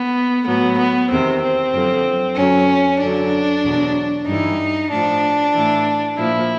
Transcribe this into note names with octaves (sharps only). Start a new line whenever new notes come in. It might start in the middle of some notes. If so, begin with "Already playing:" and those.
Already playing: B3
A2 F#3 B3
B3
E2 C3 D#3 C4
C4
F#2 D3 F3
F#2 D3 F#3 C#4
F#2 D3 F#3 D4
E2 B2 F#3
G2 E3 D#4
A2 F3 D4
A2 E3
A#2 F3 E4